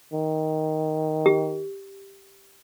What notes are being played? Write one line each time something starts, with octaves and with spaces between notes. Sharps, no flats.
D#3
G4